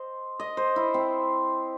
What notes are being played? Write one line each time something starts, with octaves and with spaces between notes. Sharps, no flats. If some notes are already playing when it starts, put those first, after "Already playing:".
Already playing: C5 D#5
D#5
C5
E4
C4